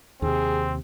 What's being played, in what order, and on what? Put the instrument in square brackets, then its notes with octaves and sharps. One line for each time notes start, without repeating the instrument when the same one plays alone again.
[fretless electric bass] D#2 C3 [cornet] C4 [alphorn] G#4